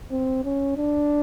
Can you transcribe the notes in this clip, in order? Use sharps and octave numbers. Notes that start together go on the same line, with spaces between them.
C4
C#4
D4